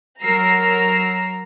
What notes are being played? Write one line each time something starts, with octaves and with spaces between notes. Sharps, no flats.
F#3 A#4 A#5 E6 C7